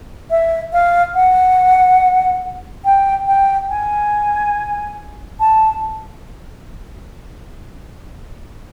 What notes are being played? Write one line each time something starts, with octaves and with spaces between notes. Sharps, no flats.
E5
F5
F#5
G5
G5
G#5
A5